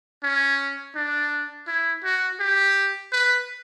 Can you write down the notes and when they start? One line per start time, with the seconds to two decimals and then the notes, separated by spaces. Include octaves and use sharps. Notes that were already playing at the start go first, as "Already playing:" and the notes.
0.23 C#4
0.95 D4
1.67 E4
2.04 F#4
2.40 G4
3.12 B4